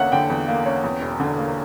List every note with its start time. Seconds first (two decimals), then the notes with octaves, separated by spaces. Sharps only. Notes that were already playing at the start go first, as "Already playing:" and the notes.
Already playing: E2 D3 A#3 C#4 E5 F#5
0.12 D3 G5
0.30 E2
0.48 A#3
0.66 C#4
0.84 E2
1.01 E1
1.20 D3
1.38 A#3